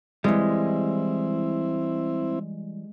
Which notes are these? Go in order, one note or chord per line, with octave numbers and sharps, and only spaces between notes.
E3 G3 G#3 C4 E4